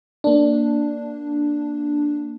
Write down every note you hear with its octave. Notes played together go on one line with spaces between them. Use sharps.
A#3 D4